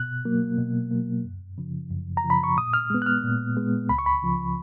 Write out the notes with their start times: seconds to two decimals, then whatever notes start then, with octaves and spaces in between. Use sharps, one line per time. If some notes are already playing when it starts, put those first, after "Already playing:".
Already playing: B2 F#6
0.25 F#3 A#3
0.58 B2
0.91 F#3 A#3
1.25 F#2
1.58 C#3 F3
1.91 F#2
2.17 A#5
2.24 C#3 F3
2.30 B5
2.44 C#6
2.57 A#2 D#6
2.73 F6
2.90 G#3 B3
3.02 F#6
3.06 F6
3.24 A#2
3.56 G#3 B3
3.89 C#2 B5
3.99 C#6
4.06 B5
4.23 C#3 F3